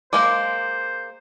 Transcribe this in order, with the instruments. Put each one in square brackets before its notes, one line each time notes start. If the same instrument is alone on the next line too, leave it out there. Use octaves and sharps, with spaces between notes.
[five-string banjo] G#3 A#3 A#4 [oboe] C5 [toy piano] D6